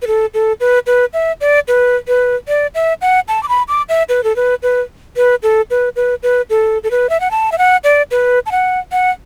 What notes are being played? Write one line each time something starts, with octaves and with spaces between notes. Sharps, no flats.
B4
A4
A4
B4
B4
E5
D5
B4
B4
D5
E5
F#5
A5
D6
B5
D6
E5
B4
A4
B4
B4
B4
A4
B4
B4
B4
A4
A4
B4
E5
F#5
A5
E5
F#5
D5
B4
A5
F#5
F#5